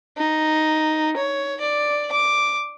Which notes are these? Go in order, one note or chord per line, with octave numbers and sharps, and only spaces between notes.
D#4
C#5
D5
D6